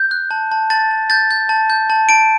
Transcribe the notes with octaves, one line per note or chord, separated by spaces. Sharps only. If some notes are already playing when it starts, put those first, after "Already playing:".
Already playing: G6
F#6
A5
A5
A5 A6
A5
G6 A6
G6
A5
G6
A5
A5 D7